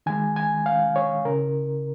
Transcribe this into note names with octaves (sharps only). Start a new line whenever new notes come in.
D#3 G#3 G#5
G#5
F5
C#5
C#3 A#4